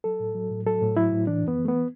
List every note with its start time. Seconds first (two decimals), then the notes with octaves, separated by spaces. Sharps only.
0.04 F#3 A4
0.20 A2
0.35 F#3
0.51 A2
0.66 F#3 A4
0.81 A2
0.97 F#3 E4
1.13 A2
1.27 E3 D4
1.43 F#2
1.48 B3
1.59 E3
1.65 A3
1.68 B3